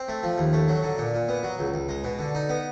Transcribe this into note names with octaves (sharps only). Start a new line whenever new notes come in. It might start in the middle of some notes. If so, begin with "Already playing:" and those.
Already playing: C4
A3
F3
D#2
A3
F#3
D3
A#2
A#2
B3
F#3
C#2
C#2
G#3
B2
D3
D#4
B3